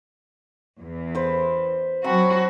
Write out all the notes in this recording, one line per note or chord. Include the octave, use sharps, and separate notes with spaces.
E2
B4 C5
F#3 C4 F#4 A5 B5